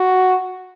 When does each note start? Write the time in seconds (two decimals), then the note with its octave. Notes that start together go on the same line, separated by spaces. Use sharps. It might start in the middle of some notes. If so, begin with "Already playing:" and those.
Already playing: F#4